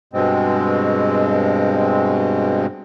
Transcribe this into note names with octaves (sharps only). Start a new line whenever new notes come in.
G2 B2 G#3 C4